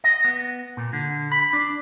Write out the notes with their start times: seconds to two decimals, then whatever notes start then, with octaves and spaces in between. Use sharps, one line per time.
0.04 D#5
0.24 B3
0.77 A#2
0.93 D3
1.32 B5
1.53 D4